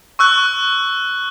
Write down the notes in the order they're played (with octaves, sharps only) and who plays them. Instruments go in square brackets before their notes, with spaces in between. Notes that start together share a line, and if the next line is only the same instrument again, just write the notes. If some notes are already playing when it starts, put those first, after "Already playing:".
[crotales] C#6 E6 F#6